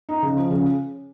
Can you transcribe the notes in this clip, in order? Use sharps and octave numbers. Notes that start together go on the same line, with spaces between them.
D#4
C#3
F3
C#3